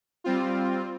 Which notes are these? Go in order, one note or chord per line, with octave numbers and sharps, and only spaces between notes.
G3 C4 F4